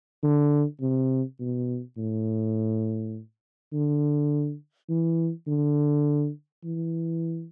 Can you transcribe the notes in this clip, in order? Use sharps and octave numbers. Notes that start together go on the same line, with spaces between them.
D3
C3
B2
A2
D3
E3
D3
E3